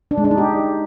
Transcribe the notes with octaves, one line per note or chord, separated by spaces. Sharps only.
D4
G#3
D4
D#4
G4